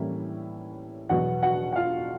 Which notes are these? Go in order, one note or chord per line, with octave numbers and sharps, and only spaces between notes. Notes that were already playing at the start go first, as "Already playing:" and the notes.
Already playing: A2 E3 G3 A#3 C#4 E4
E2 B2 F#3 B3 F#4 F#5
F#4 F#5
F#5
F4 F5